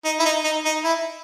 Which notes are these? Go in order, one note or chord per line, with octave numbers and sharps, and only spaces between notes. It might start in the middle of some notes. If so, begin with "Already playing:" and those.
D#4
E4
D#4
D#4
D#4
E4